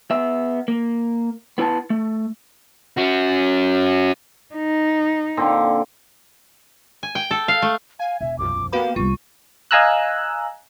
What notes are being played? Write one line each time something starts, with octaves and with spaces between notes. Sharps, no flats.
B3 E5
A#3
B3 E4 B4 G5 A5
A3
C#4 F#4
D#4
A#2 D3 C4
G#5
G5
A4
F5
A3
F5 G#5
E1 E5
C2 F#2 F3 D6
A#3 B3 F#4 G4 B4 F5 B5
C2 G3 F4 C#6
D#5 F5 G#5 A#5 E6 F#6